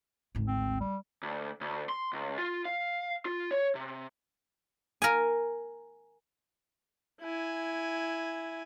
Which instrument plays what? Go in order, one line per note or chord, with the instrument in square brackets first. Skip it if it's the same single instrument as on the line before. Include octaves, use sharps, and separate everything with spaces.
[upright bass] G#1 D2
[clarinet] C4
G3
[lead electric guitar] D2
D2
C6
C#2
F4
F5
F4
C#5
C3
[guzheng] A#4 G#5
[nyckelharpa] E4 G#5